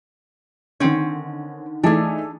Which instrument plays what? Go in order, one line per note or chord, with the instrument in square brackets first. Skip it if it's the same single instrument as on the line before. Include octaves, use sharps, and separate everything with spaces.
[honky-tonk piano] D3 D#3 [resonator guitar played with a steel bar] C4 C#4
[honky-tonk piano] E3 A3 D#4 [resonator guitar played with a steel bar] D4 G#4